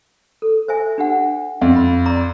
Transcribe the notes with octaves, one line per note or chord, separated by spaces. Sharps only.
A4
C5 E5 G#5
D4 G4 F#5
F2
B5
D5 A#5 D6